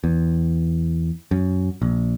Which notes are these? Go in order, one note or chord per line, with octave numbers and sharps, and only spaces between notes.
E2
F#2
A#1